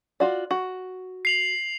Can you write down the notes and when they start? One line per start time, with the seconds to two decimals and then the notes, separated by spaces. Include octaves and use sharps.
0.20 F4 F#4 D5
0.51 F#4
1.25 C7 F7 F#7